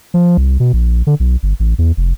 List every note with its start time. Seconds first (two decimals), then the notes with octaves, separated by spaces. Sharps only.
0.14 F3
0.37 C2
0.60 B2
0.73 A#1
1.07 D3
1.20 B1
1.43 G1
1.60 A1
1.78 E2
1.97 F1